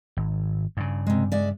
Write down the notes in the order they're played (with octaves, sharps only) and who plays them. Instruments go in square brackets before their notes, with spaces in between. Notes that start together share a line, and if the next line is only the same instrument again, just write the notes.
[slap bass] G#1
G2 C#3
[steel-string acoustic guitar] C3 G#3
G#3 D5 E5